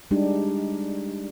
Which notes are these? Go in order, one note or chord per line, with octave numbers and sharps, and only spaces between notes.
G3 G#3 D4 D#4 G4